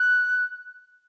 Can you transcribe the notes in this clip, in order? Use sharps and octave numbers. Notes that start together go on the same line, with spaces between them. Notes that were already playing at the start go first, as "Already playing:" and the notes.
Already playing: F#6